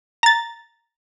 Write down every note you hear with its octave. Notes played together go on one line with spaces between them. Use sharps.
A#5 A6